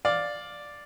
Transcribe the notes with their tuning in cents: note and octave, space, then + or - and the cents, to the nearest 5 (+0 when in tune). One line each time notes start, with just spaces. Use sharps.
D5 +0 F5 +10